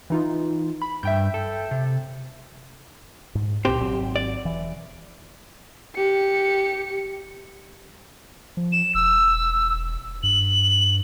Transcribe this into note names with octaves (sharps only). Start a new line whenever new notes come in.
E3 D#4 F4
B5
G2 E5 G5 G6
A4
C3
G#2
C2 A#2 C4 G4 C5
G#1 F#3 C4
D5
E1 E3
G4 C#7
F3
E7
E1 E6
G2 F#7